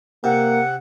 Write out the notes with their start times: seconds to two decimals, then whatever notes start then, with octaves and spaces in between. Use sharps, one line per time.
0.24 C3 A#3 F#5